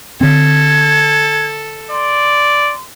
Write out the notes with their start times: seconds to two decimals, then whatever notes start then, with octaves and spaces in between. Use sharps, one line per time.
0.21 D3 C4 A4 G#6
1.91 D5 C6